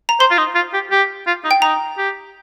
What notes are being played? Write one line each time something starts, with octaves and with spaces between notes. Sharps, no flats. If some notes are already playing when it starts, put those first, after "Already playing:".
A#5
C5 C6
F4
D#4
F4
G4
G4
F4
D#4
G5
D#4 A#5
G4